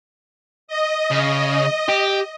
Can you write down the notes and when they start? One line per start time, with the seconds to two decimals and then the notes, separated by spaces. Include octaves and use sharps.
0.68 D#5
1.11 C#3
1.89 G4